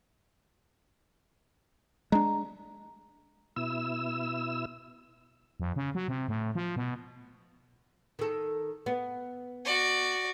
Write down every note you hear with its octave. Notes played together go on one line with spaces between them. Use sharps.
G#3 D4 A#5
B2 E4 E6
F2
C#3
F#3
C3
A2
F3
B2
D#3 A4
B3
F#4 D5